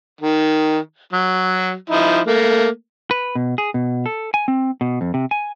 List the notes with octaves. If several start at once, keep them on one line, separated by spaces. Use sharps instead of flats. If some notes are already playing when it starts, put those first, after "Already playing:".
D#3
F#3
F3 D#4 E4
A3 A#3
B4
B2
G#4
B2
A4
G#5
C4
B2
F2
C3
G#5